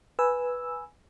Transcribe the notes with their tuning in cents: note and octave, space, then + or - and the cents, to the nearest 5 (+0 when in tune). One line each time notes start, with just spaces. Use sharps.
B4 -5 G#5 +0 E6 +0